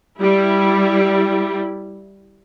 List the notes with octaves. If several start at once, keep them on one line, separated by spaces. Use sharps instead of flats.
G3 E4